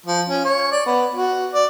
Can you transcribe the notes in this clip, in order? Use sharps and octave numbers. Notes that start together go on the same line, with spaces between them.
F3
C#4
C#5
D5
B3
F#4
D5